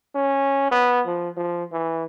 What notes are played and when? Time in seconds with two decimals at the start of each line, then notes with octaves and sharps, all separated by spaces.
0.15 C#4
0.71 B3
1.07 F3
1.37 F3
1.72 E3